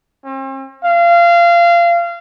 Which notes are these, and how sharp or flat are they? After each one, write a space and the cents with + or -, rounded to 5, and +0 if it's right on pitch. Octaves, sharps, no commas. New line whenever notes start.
C4 +45
F5 -25